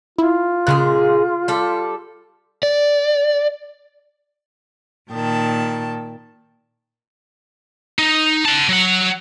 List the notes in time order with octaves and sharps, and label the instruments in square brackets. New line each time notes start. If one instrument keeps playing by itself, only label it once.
[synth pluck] E4 [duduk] F4
[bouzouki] A#2 G#3 G#4 [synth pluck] C#3 F#6
[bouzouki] G3 A4
[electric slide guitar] D5
[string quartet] A#2 D#3 G5 A5
[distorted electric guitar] D#4
F#5 A5
F#3 F#5